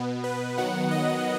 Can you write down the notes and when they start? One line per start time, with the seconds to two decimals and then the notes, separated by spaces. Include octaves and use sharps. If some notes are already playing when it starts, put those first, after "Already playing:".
Already playing: B2 B3
0.24 B4
0.57 D#3 F#3 B3 F#5
0.91 D#5